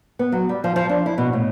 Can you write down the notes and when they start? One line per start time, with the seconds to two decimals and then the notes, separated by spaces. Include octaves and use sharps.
0.19 B3
0.32 F#3
0.49 G3
0.64 F3
0.76 F3
0.89 D4
1.06 E4
1.18 B2
1.33 A2